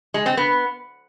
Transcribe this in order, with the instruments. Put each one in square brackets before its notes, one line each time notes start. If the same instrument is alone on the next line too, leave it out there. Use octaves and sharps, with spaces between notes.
[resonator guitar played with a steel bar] G#3
C4
B3